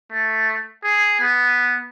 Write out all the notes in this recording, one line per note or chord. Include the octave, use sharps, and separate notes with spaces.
A3
G#4
B3